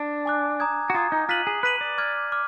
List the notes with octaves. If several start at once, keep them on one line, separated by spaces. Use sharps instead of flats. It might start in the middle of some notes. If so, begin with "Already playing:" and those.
Already playing: D4
G#5 D6 F#6
A#5 D#6 G#6
F#4
F4 A#5 D#6 G#6
D#4
F4 F#6 B6 D#7 F#7
G#4
B4 F#6 B6 D#7 F#7
D5
D6 F6 G#6
D6 F6